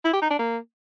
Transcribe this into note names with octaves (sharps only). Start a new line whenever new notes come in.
E4
G4
D#4
D4
A#3